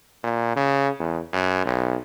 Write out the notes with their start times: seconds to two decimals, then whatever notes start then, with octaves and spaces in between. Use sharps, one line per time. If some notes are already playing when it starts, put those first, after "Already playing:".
0.24 A#2
0.56 C#3
0.99 E2
1.33 F#2
1.65 B1